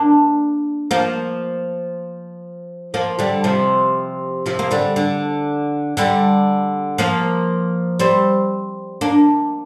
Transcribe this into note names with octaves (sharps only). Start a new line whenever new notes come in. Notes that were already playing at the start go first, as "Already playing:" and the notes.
Already playing: A#3 D4
F3 A#3
F3 A#3
D3 G3
C3 F3
C3 F3
A#3
D3 G3
D3
D3 G3
F3 A#3
G3 C4
A#3 D4